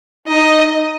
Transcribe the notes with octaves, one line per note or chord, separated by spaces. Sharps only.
D#4 D#5